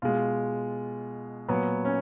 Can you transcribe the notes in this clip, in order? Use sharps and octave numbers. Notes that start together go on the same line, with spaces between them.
B2 G#3 F4
A#2 F#3 B3
C#4